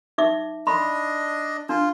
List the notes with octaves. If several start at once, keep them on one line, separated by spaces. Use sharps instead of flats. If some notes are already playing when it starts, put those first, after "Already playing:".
D#4 E5 D6
D4 D#5 B5 C6
D4 F4